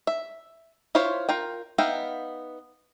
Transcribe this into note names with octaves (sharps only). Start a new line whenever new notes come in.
E5
E4 F4 C5 C#5 B5
F4 A#4 G5
B3 D#4 E5 F5 G5